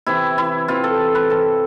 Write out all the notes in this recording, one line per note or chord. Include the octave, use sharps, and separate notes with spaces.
C3 E3 E4
E4
C3 E3 F4
A4
B4
C3 E3 A4